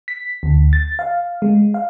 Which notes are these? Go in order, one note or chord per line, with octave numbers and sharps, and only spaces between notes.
B6
D2
A6
F5
G#3
F5